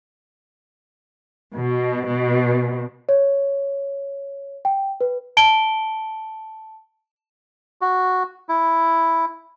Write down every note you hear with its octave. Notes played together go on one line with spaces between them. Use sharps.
B2
B2
C#5
G5
B4
A5 D7 G7
F#4
E4